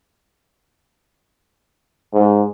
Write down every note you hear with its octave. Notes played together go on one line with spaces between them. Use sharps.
G#2